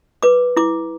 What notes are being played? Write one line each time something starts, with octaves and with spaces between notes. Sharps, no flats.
B4 D6
E4 D6